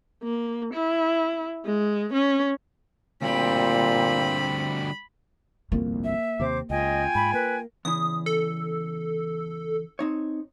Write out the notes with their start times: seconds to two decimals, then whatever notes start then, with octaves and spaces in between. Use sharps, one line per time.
0.23 A#3
0.74 E4
1.65 G#3
2.13 C#4
3.22 D2 A#2 G3 C4 B5
5.72 G1 C2 F2 A#3
6.04 E5
6.40 D#2 C3 C4 C5 D6
6.70 C#2 F4 D#5 G5 G#5
7.15 G#2 B5
7.34 A#3 B4
7.85 E2 C#3 E3 D#6
8.26 A4
9.99 C4 D#4 C#5